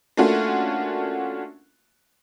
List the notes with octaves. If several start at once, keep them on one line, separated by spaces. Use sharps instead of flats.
A3 A#3 C#4 D4 F4 F#4